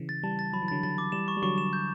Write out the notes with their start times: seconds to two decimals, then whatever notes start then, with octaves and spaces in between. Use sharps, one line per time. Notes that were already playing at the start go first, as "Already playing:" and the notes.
Already playing: C#3 E3
0.09 A6
0.23 E3 G3 A5
0.39 A6
0.53 F#3 B5
0.62 E3
0.68 D3 F#3 A6
0.83 D3 F#3 A6
0.98 D6
1.12 E3 G3 E7
1.28 C#6
1.37 G3
1.42 D3 F#3 C#6
1.58 E7
1.73 G6